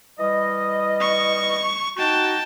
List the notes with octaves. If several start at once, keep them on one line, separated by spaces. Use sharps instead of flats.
E3 G3 D#5
C#6
D#4 F#4 G5 A5